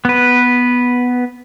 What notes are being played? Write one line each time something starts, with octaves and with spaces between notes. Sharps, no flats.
B3 B4